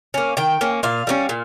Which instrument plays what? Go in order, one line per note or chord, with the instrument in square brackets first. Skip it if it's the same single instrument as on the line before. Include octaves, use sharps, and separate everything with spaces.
[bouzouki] A#3 C#4
D#3 G5
A#3 C#4
A#2 F5
G3 A#3 C#4
A#2